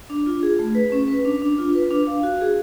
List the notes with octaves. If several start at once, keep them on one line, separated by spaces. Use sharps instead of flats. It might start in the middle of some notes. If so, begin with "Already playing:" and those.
D4
F4
G#4
A3
B4
C#4
B4
D4
D4
F4
B4
D4
F5
F#4
G#4